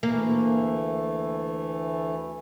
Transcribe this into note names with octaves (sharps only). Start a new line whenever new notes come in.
D2 E3 A3 A#3